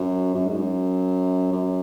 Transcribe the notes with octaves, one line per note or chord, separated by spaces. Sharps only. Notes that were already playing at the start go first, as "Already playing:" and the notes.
Already playing: F#2
F#2
G#2
F#2
F#2